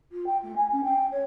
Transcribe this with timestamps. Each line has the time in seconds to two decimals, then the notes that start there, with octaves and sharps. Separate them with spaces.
0.12 F4
0.26 G5
0.43 A3
0.56 G#5
0.72 C#4
0.84 G5
1.11 C#5